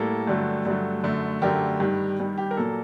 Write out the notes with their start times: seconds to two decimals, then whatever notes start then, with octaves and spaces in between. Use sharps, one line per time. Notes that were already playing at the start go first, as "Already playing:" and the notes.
Already playing: A2 G3 A#3 A4
0.27 G2 D3 F#3 A3
0.65 G2 D3 F#3 A3
1.03 F#2 D3 A3
1.42 F#2 D3 A3 G4 A#4
1.80 G2 D#3 G3
2.20 G2 D#3 G3
2.38 G4
2.51 A#4
2.57 A#2 F#3 A#3 A4